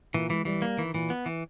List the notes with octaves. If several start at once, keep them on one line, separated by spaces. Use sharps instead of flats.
A#2 E3
E3 G#3
E3 G3
A#3
D#3 E3
A#2 E3
B3
E3